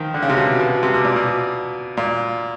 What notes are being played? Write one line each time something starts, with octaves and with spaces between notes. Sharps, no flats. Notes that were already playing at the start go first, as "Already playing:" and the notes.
Already playing: D#3 F3
D3
C#3
C3
B2
B2
C3
B2
A#2
B2
A#2